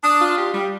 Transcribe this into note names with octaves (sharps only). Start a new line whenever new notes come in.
D4 D#6
F4
G3
G3